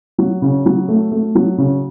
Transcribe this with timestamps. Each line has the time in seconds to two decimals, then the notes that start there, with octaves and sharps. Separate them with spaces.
0.18 F#3
0.42 C#3
0.66 F#3
0.88 A3
1.11 A3
1.35 F#3
1.58 C#3